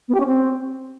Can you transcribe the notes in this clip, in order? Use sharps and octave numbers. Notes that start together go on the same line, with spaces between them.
B3
G4
C#4
C4